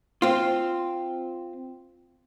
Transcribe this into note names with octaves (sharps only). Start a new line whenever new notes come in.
C4 F4